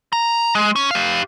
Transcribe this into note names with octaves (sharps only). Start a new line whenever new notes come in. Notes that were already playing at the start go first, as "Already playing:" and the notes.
A#5
G#3
C#4
G4 F5